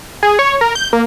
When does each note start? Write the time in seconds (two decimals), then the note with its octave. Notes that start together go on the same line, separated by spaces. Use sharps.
0.23 G#4
0.39 C#5
0.61 A#4
0.75 G6
0.93 A#3